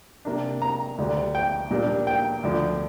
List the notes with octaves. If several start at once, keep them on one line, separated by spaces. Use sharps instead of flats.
C3 A#3 D4
A#5
D2 D3 G3
G5
A#2 G3 A#3 D4
G5
D2 D3 F3